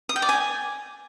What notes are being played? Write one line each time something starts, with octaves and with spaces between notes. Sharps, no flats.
D#6
G5
D5
G#5